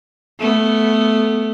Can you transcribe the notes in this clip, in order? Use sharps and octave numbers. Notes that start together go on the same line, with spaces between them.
A3 B3